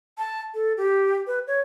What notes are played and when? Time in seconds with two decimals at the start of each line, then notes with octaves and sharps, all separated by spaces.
0.18 A5
0.54 A4
0.77 G4
1.27 B4
1.47 C#5